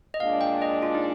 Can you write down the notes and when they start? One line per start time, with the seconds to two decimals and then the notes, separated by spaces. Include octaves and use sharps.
0.14 D#5
0.20 A#2 G#3 D4 F5
0.41 G5
0.62 D#5
0.83 F4
0.95 D#4